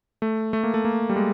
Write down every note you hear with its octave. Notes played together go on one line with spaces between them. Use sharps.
A3
A3
A#3
A3
A#3
G3
G#3